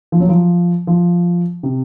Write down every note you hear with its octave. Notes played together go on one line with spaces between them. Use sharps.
F3
F#3
F3
F3
C3